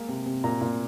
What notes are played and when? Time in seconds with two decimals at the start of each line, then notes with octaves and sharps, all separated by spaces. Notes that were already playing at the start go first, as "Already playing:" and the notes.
Already playing: G#3 A#3
0.08 C3
0.26 C3
0.44 A#2 A#5
0.61 A#2